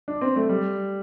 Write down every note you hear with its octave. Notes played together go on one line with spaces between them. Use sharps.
D4
C4
A3
G3